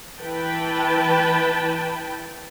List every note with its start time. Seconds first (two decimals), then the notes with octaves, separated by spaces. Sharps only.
0.20 E3 B4 G5 A5